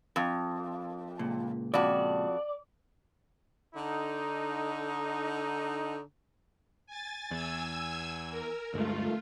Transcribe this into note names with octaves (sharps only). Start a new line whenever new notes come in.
F2
C#2 A#2
F2 F#4 D5
D3 D#4
G#5 A6
E2 G#5 E6 G#6
A#4
D2 G2 G#3 A3 F4